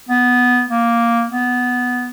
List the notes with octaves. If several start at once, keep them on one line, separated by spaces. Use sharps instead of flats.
B3
A#3
B3